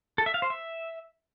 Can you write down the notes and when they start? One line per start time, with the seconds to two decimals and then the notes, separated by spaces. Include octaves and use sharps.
0.18 A4
0.26 E5
0.34 F5
0.42 C5
0.50 E5